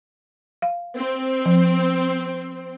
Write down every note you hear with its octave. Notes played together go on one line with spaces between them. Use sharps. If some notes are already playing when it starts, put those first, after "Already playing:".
F5
C4
F3